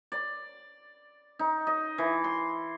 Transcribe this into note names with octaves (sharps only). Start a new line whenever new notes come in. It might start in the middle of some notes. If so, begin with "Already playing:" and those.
D5
D#4
D#5
E3
C6